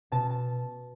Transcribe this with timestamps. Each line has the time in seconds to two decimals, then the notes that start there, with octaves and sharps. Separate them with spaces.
0.12 B2 A5
0.30 A5